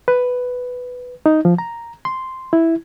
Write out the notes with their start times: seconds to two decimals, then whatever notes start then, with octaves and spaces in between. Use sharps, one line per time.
0.08 B4
1.26 D#4
1.45 F3
1.58 A#5
2.05 C6
2.53 E4